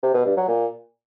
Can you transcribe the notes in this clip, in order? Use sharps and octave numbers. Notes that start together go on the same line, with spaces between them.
C3
B2
G2
F#3
A#2